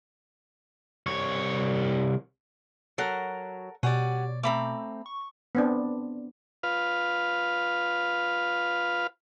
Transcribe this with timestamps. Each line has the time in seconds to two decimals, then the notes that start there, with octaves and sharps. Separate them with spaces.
1.06 C2 C#5
2.98 F#3 A4 A#4 F#5
3.83 B2 G3 C#5 D5 F#5 G#5
4.43 A3 C4 A#5 B5 D6
5.06 C#6
5.55 B3 C4 D4
6.63 F4 B4 F5